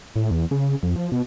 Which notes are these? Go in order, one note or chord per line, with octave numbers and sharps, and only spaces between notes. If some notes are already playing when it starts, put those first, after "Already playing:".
A2
E2
C#3
F2
F3
B2